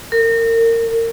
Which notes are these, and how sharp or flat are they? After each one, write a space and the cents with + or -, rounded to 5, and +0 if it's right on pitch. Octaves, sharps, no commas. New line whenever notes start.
A#4 -30